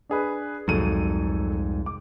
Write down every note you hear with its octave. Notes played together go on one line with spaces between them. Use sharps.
D4 G#4 B4
C2 F2 G#2 F#3 A4 D#7
D6